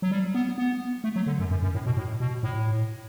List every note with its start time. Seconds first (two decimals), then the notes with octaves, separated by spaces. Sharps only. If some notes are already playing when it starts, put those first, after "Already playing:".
0.02 F#3
0.11 G3
0.34 B3
0.58 B3
1.04 A3
1.16 F#3
1.27 D3
1.39 F#2
1.51 F#2
1.63 F#2
1.74 A2
1.86 B2
1.97 A2
2.20 B2
2.43 A2